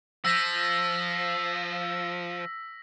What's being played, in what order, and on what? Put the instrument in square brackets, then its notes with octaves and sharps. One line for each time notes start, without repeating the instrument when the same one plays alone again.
[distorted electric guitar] F3 [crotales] E6 A#6 B6